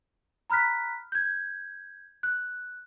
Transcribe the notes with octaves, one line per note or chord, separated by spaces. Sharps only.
A#5 B5 F6 F#6 B6
G6 G#6
F#6